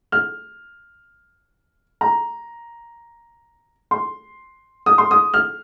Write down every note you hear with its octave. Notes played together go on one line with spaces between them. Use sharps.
F6
A#5
C6
D#6
C6
D#6
F6